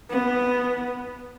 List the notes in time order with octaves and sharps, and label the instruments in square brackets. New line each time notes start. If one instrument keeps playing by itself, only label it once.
[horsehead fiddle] B3